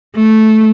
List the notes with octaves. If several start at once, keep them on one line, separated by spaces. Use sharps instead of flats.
A3